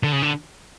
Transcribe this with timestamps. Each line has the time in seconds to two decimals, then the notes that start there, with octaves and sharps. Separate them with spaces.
0.03 D3
0.12 C#3
0.22 D3